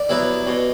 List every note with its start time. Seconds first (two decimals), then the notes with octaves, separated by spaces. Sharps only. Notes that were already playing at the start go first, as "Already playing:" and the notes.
Already playing: D5
0.09 F#3 B3 E4
0.47 B2